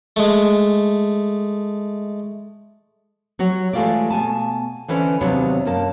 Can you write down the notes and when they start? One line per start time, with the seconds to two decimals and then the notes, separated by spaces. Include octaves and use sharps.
0.16 G#3 A3
3.39 F#3 F#4 C#5
3.73 E3 G#3 A3 F4 G4 D5
4.10 B2 G#5 A5
4.88 D3 E3 C#4 B4 C5
5.21 D#2 C3 F#3 B3 D4 C#5
5.65 F#2 A#3 A5